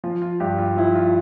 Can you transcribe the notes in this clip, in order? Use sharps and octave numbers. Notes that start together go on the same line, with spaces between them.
F3 F4
F4
G2 G4
F4
F3 E4
F4